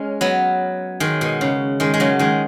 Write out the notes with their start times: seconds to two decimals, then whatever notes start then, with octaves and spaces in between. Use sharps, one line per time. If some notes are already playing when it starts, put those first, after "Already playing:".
Already playing: G#3 C#4
0.21 F#3 B3
1.00 D#3 G#3
1.21 B2
1.41 C#3
1.80 D#3 G#3
1.94 G#3
2.00 C#3 F#3
2.19 D#3 G#3